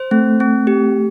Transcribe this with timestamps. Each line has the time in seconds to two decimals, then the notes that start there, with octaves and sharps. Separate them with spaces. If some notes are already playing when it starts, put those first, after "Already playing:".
Already playing: C5
0.11 A3 C4
0.40 C4
0.67 G4